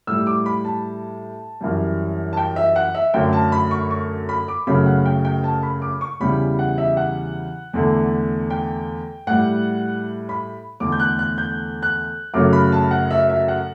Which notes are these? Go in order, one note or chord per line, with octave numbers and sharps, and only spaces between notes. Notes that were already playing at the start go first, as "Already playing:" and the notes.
A2 G3 E6
D6
B5
A5
F#2 E3 G3
A5
G5
E5
F#5
E5
F#2 D3 F#3 A3 G5
A5
B5
C#6
C#6
B5
D6
F#2 C#3 F#3 A3 B5
F#5
G5
G5
A5
B5
D6
C#6
E2 C#3 E3 G3 B5
F#5
E5
F#5
E2 D3 A3
G5
A2 G3 F#5
B5
E2 D3 A3 D6
G6
F#6
F#6
G6
F#6
F#2 C#3 F#3 A3 D6
B5
A5
F#5
E5
E5
F#5